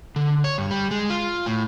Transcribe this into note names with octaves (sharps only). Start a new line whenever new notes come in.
D3
C#5
G2
G3
G#3
F4
A2